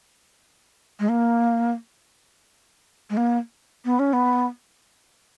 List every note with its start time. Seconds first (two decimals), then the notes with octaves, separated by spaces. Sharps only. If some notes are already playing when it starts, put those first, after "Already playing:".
1.00 G#3
1.09 A#3
3.10 G#3
3.17 A#3
3.85 B3
3.99 C#4
4.13 B3